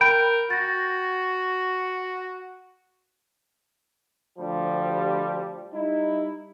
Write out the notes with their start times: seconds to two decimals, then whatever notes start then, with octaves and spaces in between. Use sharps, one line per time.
0.01 A#4 G5 B5
0.50 F#4 A6 A#6
4.39 D2 F3 G3
5.73 G3 D#4 E4